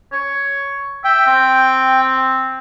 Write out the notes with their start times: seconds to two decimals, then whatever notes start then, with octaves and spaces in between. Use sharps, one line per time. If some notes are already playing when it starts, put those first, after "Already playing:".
0.12 C#5
1.04 E5 G5
1.26 C4